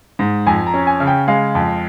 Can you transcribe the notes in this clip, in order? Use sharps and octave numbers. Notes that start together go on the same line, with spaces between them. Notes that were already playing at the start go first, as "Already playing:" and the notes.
G#2
F2 G#5
A#5
C#4
G#5
C#3
G5
G#3 F5
F2